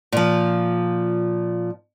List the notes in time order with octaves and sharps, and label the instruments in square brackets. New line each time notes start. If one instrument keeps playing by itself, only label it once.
[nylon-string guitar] A#2 F3